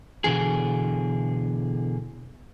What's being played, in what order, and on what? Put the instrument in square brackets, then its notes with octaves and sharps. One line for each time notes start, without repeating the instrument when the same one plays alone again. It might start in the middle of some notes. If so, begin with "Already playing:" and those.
[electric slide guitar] B2 D3 E3 G#4